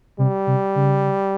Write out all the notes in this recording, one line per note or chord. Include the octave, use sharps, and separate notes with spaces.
C3 G3
C3
C#3